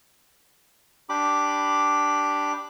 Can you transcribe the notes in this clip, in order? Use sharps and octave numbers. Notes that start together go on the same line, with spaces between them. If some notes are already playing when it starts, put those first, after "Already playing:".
D4 G4 B5 D6